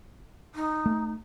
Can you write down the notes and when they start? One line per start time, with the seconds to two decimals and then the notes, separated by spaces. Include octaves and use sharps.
0.55 D#4
0.86 A3